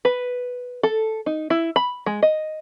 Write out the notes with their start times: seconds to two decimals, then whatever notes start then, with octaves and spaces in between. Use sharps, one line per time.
0.05 B4
0.83 A4
1.26 D#4
1.50 E4
1.76 B5
2.06 G#3
2.23 D#5